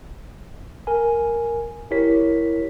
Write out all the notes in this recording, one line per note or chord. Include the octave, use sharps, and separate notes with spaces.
A#4 G#5
E4 G4 A#4 C#5 B6